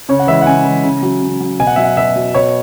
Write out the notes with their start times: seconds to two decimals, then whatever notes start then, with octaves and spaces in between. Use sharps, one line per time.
0.09 C#3 C#5
0.19 F#5
0.27 E3 G#3 E5
0.42 F#5
0.46 C#3 G#5
0.65 E3 G#3
0.83 C#3
1.03 F#3
1.22 C#3
1.40 F#3
1.60 B2 G#5
1.67 F#5
1.76 F#3 E5
1.84 F#5
1.97 B2 E5
2.16 F#3
2.35 B2 C#5